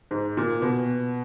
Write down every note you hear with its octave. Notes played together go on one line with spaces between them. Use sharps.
G#2
A#2
B2